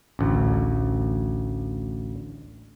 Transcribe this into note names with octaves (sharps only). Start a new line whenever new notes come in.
A1 D2